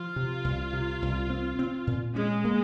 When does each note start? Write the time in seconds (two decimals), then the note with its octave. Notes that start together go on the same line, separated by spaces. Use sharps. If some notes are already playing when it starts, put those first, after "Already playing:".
Already playing: F3 F4
0.16 C3
0.44 C2
0.73 C3
1.02 C2
1.30 C4
1.59 C4
1.87 A#2
2.15 G#3 C#4
2.45 A#3